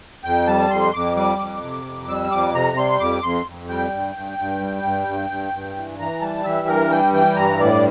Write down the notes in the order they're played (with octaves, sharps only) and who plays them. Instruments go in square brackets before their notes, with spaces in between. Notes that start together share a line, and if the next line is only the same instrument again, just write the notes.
[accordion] F2 G5
G3 A5
F2 C6
F2 D6
G3 D6
F2
C3
F2
G3 E6
F2 D6
C3 A#5
G3 C6
F2 D6
F2 C6
F2
G3 G5
G2
G2
G2
G3
G2
G2
G2
G2
E3
E3 A#5
G3 A5
E3 E5
G2 A#4
G3 G5
E3 G5
G2 A#5
A2 D5